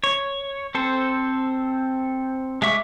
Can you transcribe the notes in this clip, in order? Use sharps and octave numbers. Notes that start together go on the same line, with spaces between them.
C#5
C4 A4 C5
G#3 G#4 E5 C#6 D6